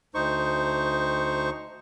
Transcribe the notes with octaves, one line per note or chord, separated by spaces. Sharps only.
D2 D#4 C5 C#6